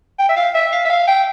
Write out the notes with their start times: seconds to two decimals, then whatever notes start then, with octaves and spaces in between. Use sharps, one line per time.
0.19 G5
0.29 E5
0.36 F5
0.54 E5
0.72 F5
0.85 E5
0.90 F5
1.08 G5